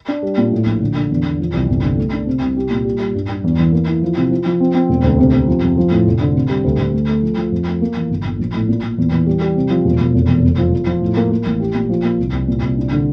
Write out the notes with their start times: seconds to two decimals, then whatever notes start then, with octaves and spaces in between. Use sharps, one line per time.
0.08 D4
0.23 G3
0.38 A#2
0.52 A2
0.66 A#1
0.81 D3
0.96 D3
1.11 E2
1.25 E2
1.40 F3
1.53 C2
1.69 G1
1.83 D3
1.98 A3
2.13 D4
2.27 C3
2.42 C2
2.57 G4
2.71 A#2
2.85 G3
3.00 G3
3.15 G2
3.28 G2
3.44 E2
3.59 E3
3.72 A#3
3.87 E4
4.03 F3
4.17 C3
4.31 F3
4.46 F3
4.60 C4
4.74 C4
4.89 E1
5.04 D2
5.19 C3
5.34 C3
5.47 F3
5.62 F2
5.78 F3
5.91 A2
6.07 F1
6.21 D3
6.35 C3
6.49 G3
6.64 D2
6.78 D2
6.93 A3
7.09 A3
7.22 F3
7.37 F3
7.52 F2
7.67 A3
7.81 A#3
7.96 E3
8.11 G1
8.25 G1
8.39 A#1
8.54 A2
8.69 A#2
8.83 A#2
8.98 E2
9.12 E3
9.27 G3
9.41 G3
9.56 C3
9.70 F3
9.85 E1
10.00 E1
10.14 F1
10.28 E2
10.44 F1
10.58 F3
10.73 F3
10.87 F3
11.02 A2
11.17 A#3
11.31 A#3
11.46 A1
11.60 G4
11.75 A#2
11.89 F3
12.04 A#3
12.19 C2
12.33 C2
12.48 A#2
12.62 C2
12.78 D4
12.92 D3